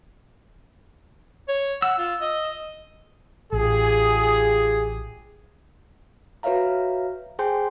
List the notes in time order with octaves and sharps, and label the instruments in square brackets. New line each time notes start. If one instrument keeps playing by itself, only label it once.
[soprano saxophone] C#5
[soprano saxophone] F#5 [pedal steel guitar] E6
[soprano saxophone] F4
D#5
[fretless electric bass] A1 [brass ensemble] F4 G4 G#4
[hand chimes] F#4 B4 C#5 E5 F5 A#5
G#4 C5 G5 G#5 C6 G6